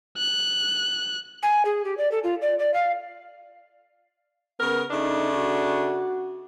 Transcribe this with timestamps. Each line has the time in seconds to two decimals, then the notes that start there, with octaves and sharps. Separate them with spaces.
0.18 F#6
1.43 G#5
1.65 G#4
1.85 G4
1.98 D5
2.12 A4
2.24 F4
2.42 D5
2.59 D5
2.74 F5
4.60 C#3 B3 A#4
4.91 C#3 A3 D4 D#4
5.34 F#4